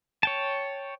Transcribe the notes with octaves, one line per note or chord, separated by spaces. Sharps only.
C#5 G5 A5